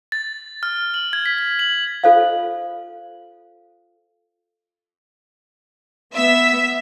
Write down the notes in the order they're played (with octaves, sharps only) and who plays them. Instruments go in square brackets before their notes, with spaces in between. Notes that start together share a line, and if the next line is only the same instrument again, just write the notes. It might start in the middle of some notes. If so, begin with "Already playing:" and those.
[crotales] A6
F6
F#7
G#6
B6
G#6
F#7
[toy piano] F4 A4 C5 D#5 F5
[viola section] B3 [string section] E5